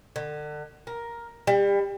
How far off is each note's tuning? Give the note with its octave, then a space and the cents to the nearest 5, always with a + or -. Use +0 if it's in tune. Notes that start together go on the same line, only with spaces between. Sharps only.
D3 +35
A#4 +10
G3 +30